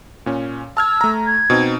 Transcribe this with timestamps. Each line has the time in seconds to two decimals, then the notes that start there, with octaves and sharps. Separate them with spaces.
0.26 A#2 C#4
0.77 A5 E6 F6 G#6
1.01 A3 A#5
1.27 G#6
1.50 B2 C4 D#4